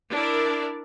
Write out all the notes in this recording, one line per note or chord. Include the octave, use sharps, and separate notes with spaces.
D4 E4 A#4 D5